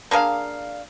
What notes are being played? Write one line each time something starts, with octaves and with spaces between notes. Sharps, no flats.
A#3 D4 G#4 F5